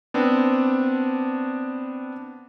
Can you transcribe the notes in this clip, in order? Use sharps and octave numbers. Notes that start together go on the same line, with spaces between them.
B3 C4 D4